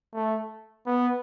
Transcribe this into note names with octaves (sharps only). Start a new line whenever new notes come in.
A3
B3